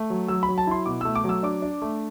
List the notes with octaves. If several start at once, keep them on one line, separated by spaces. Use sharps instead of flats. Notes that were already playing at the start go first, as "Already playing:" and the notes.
Already playing: A3
F#3
F#3 E6
B5
F#3
A5
E4 C6
B2 D6
A3 E6
D6
F#3 E6
D4 D6
D4
A3